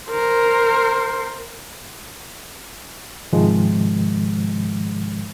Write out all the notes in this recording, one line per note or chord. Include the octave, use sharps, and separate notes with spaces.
A#4 C5
G#2 C3 D#3 F3 G#3